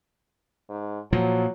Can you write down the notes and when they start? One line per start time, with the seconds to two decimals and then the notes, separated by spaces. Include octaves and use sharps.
0.70 G#2
1.13 A#2 F3 F#3